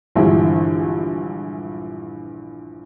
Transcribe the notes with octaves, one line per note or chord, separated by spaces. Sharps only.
A#1 G2 D3 E3 G#3